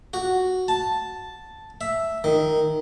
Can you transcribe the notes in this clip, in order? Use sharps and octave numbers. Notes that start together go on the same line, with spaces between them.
F#4
A5
E5
D#3